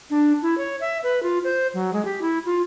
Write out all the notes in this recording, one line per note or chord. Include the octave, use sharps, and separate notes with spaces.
D4
E4
C#5
E5
B4
F4
C5
F#3
G#3
G4
E4
F4